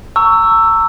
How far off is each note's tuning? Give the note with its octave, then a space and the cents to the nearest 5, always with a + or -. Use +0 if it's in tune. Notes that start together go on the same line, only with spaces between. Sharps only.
A#5 -40 C#6 +20 E6 +5